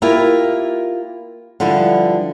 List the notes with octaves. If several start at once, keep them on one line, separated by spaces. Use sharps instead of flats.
A#3 E4 F4 G4 A#4
D3 F3 G3 E4 B4